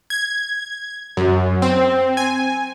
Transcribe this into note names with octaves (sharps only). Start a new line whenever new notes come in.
G#6
F#2
C4
G#5